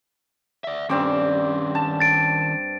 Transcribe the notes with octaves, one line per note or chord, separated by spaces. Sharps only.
D5 E5
G2 D#3 C4 C#4 D6
A5
A6 D7